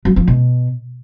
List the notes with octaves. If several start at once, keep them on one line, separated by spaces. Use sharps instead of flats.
F#3
F3
B2